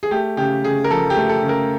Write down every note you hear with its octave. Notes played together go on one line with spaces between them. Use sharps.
G#4
A3 G4
C#3 G4
C#3 G#4
A#4
F3 A4
G4
A3
A4
C#3
A#4